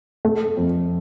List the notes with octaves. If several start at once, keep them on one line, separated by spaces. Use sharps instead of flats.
A3
F2